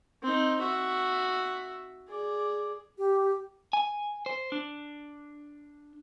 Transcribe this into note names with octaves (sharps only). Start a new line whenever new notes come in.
C4 D#4
F#4 E5
G#4 D5
G4
G#5
C5
D4